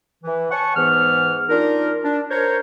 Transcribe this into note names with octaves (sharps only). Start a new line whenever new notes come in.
E3
C#5 F#5 G#5 A5 C#6
G#2 E3 B3 F6
D4 D#4 F4 A#4
D4
A#4 C5 C#5